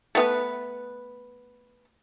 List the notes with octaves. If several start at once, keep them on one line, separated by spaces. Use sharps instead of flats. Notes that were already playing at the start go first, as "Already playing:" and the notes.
A3 B3 B4